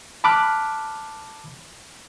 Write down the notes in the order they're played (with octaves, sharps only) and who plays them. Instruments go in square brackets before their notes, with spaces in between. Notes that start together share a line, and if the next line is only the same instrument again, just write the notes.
[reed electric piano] A5 B5 D6 F6 F#6